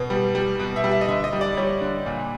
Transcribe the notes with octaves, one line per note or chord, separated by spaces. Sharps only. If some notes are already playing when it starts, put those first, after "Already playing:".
Already playing: B2
G3
G3
B2
E5
G3
E5
D#5
D3 E5
D#5
G3
D5
G3 C#5
D3
A#2